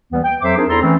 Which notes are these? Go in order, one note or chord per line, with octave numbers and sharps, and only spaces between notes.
D#2 E3 G3 B3
G5
F2 F#3 C5 E5 D6
C4 D4 D#4 G#4 A#4 C5
E2 E4 A4 A#5 C6
E3 A3 C4 C#4